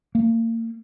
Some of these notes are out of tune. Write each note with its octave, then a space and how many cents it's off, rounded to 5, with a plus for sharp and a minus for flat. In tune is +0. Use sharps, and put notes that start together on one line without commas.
A#3 -35